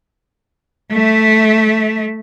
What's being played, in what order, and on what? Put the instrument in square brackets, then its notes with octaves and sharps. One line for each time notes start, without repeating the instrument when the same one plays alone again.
[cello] A3 E5